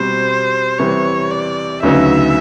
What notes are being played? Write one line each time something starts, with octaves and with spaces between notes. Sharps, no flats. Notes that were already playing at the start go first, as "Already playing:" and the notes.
Already playing: B2 G3 C4 C5
C3 E3 G3 B3 C#5
D5
D2 C#3 F#3 B3 D#4 E5